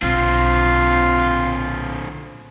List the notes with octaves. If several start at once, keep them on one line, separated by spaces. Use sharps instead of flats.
B1 D3 C4 F4